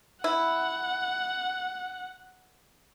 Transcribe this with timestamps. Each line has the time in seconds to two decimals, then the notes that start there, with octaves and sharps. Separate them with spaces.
0.24 E4 F#5